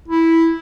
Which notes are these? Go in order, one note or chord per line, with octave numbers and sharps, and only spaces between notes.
E4